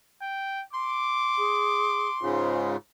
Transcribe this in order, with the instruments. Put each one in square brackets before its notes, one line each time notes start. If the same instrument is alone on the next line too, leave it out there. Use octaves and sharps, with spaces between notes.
[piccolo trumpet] G5
[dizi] C6 [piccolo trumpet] D6
[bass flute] G#4
[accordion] G#2 C#3 [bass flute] F4